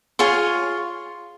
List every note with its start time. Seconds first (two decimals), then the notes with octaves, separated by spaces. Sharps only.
0.19 F4 G#4 C#5 C6